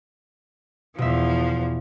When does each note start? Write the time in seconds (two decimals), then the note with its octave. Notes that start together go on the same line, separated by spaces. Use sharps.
0.98 E2 B2 F3 E5